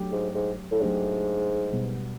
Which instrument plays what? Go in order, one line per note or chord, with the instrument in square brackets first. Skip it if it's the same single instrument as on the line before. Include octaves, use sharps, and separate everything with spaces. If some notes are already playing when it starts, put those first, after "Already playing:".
Already playing: [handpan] F#3 A3 D4 G4
[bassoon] G#2
G#2
A2
[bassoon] G#2 [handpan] F#3 A3 D4 G4
[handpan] B2 G3 B3